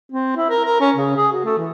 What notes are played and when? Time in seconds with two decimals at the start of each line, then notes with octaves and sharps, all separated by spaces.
0.12 C4
0.36 E4
0.50 A#4
0.65 A#4
0.81 C#4
0.96 C#3
1.17 G#4
1.32 F#4
1.44 A3
1.58 E3